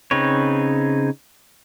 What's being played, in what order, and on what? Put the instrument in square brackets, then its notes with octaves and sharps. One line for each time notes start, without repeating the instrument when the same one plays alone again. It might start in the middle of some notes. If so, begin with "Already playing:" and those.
[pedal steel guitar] C#3 C4 D#4 B4 C#5